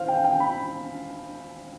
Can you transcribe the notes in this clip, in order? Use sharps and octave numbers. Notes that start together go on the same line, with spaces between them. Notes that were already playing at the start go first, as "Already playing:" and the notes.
Already playing: E3 C5 F5
G5
G5
B5